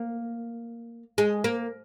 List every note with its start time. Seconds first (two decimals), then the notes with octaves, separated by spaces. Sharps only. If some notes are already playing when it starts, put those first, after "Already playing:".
Already playing: A#3
1.18 G#3
1.44 A#3